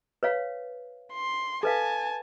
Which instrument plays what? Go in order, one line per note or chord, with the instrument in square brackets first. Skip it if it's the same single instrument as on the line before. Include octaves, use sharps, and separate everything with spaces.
[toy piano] B4 C#5 F5
[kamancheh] C6
[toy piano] A4 B4 F5 [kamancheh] G#5 A5